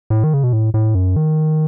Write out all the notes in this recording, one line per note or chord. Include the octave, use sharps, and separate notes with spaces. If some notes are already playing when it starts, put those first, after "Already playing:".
A2
D#3
C#3
B2
A2
A2
F#2
D#3